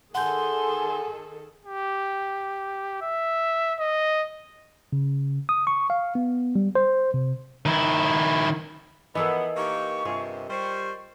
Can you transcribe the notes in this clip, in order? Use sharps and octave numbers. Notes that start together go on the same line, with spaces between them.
D#3 G#4 A4 F#5 G#5 C6 G6
G4
E5
D#5
C#3
D#6
C#6
F5
B3
G3
C5
C3
D#3 E4
E3 F3 B3 E4 A4 A#4 D#5
A#3 D#4 G4 C#6
G2 C3 F4 G#4
G3 C5 C#6